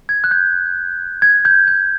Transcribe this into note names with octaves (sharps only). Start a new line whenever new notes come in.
G#6
F#6
G6
G#6
G6
G6